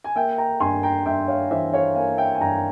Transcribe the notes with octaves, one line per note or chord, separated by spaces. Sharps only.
G#5
A#3 E5 G5
G5 A#5
G2 G#5 C6
G5 A#5
G2 E5 G5
C#5 F5
E3 C5 E5
C#5 F5
A#3 F5 G#5
E5 G5
G#5
G2 G5 A#5